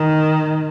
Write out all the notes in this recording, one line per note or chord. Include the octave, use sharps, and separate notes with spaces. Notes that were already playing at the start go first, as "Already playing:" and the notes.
Already playing: D#3